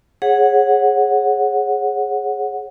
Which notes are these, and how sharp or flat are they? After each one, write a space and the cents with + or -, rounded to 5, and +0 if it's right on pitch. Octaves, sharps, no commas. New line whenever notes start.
G#4 +0 C#5 -25 F#5 -10